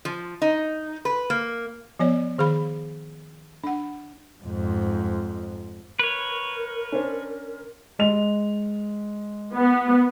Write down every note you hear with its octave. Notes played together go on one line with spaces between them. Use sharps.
F3
D#4
B4
A#3
F3 B3 C#5 D5
D#3 G#4 F5 B5
D4 F#5
F2 G#2
A#4 B4 C#5
C#4 D4 C5
G#3 F7
B3